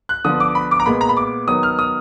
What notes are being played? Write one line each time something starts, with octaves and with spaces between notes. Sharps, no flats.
F#6
D3 F3 B3 D#6
D6
B5
D6
A#5
A#2 G#3 B3 B5
A#5
B5
D6
D#3 F#3 B3 D#6
F6
D#6